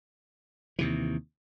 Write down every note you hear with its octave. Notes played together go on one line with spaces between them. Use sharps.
D#2 C3 E3